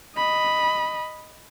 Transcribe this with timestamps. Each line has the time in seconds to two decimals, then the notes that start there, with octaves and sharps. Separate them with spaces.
0.17 D#5 B5